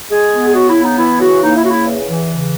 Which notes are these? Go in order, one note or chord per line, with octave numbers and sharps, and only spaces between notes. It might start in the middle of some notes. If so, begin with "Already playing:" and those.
G#3 G#4
B3
G#4
C#3 F#4
E4
B3
D#4
E3 E4
C#3 F#4
A#3 D#4
E4
C#3 F#4
E4
E2
E3
C#3